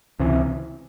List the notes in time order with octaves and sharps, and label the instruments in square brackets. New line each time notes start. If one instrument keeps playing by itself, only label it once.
[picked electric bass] C#2 C3 E3